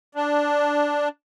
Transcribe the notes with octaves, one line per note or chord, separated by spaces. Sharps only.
D4